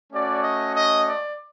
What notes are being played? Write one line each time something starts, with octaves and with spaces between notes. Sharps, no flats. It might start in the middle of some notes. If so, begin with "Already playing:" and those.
A3 C#4 F#4 D5
D#5
D#5
D5